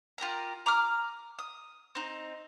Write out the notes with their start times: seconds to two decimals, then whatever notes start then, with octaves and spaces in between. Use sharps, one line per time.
0.18 F4 G4 A#4 A#5
0.66 A#5 D6 D#6 F6
1.39 D#6
1.95 C4 D#4